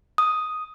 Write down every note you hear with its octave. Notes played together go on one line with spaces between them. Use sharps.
D#6